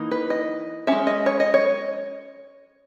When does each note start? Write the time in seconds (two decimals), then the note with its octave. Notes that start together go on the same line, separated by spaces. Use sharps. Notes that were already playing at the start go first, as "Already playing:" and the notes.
Already playing: E3 A#3 D#4
0.11 B4
0.30 D#5
0.87 G#3 C#4 E5
1.07 D#5
1.26 C#5
1.40 D#5
1.54 C#5